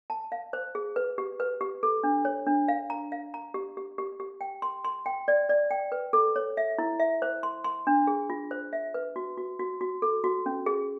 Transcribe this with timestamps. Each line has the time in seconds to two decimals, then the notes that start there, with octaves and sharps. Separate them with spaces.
0.10 A5
0.32 F5
0.53 C5
0.75 G#4
0.96 B4
1.18 G4
1.40 B4
1.61 G4
1.83 A4
2.03 D4
2.25 C#5
2.46 D4
2.68 F5
2.90 A#5
3.12 F5
3.34 A#5
3.54 G4
3.77 G4
3.98 G4
4.20 G4
4.41 G5
4.62 C6
4.84 C6
5.06 G5
5.28 D5
5.49 D5
5.71 G5
5.92 B4
6.13 A4
6.36 C#5
6.57 E5
6.78 E4
6.99 E5
7.22 C5
7.43 C6
7.64 C6
7.87 D4
8.07 G#4
8.30 F4
8.51 C5
8.73 E5
8.94 B4
9.16 F#4
9.37 F#4
9.59 F#4
9.81 F#4
10.02 A4
10.24 F#4
10.46 C#4
10.66 G#4